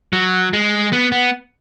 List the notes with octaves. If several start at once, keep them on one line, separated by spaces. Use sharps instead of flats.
F#3
G#3
B3
B3